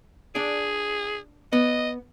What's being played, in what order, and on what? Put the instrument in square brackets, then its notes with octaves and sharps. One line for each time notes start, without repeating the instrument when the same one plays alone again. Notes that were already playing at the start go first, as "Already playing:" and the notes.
[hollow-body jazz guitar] D4 D5 [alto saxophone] G#4
[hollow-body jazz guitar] B3 [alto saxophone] D#5